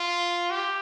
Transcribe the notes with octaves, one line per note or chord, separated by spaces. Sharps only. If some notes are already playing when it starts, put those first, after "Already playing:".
Already playing: F4
G4